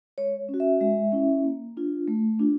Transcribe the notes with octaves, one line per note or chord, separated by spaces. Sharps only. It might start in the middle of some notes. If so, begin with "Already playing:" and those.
G#3 C#5
C#4
F#4
E5
G#3 E5
C#4 E4
A#3
D4 F4
A3
D4 F4